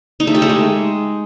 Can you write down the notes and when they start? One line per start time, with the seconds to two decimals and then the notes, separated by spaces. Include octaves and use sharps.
0.20 D#4
0.27 A3
0.35 G4
0.42 A3
0.49 G#3